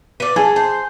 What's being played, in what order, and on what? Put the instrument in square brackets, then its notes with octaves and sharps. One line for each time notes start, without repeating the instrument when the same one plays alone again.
[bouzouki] B4 D5
[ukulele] G#4 [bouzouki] A4
[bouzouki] C5